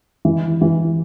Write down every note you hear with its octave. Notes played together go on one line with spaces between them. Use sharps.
E3
E3